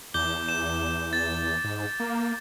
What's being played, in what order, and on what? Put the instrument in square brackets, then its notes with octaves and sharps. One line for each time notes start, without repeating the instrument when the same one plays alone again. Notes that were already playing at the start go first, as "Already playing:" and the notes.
[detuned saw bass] E2 [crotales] D6 G6 G7
[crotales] E7
A6
[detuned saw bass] G#2
A#3